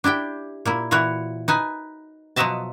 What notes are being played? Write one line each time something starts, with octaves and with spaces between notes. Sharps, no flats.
D4 E4 G4 G5
A#2 A#3 E4
A#2 E3 E4 F#4 C#5 F#5
D#4 B4 G#5
B2 F3 F#3 D#5 E5 A5